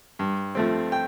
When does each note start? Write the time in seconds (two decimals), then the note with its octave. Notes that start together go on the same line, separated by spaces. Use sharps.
0.19 G2
0.55 F3 A3 C4
0.92 G5